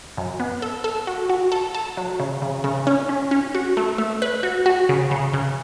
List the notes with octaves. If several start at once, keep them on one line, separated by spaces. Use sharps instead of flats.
F#2
B3
A4
A4
F#4
F#4
A4
A4
F#3
C#3
C#3
C#3
C#4
C#4
C#4
F#4
A3
A3
B4
F#4
F#4
C#3
C#3
C#3